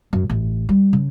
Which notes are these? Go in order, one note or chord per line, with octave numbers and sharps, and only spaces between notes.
F#2
A1
G3
C#3